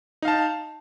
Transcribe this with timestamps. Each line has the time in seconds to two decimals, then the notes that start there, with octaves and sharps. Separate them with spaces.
0.22 D#4
0.25 F5
0.28 A5